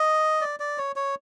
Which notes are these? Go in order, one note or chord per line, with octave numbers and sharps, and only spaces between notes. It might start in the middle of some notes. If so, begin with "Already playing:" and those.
Already playing: D#5
D5
D5
C#5
C#5